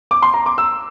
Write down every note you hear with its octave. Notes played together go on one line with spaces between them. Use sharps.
D6
C6
A#5
D6
E6